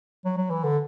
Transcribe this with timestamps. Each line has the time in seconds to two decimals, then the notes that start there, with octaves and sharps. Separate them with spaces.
0.25 F#3
0.37 F#3
0.50 E3
0.64 D3